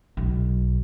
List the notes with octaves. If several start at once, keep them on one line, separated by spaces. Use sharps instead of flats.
B1